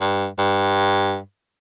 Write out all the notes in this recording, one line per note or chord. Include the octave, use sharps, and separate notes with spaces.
G2
G2